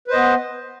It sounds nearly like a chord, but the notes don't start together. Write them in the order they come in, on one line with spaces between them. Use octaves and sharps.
B4 C5 D#5 B3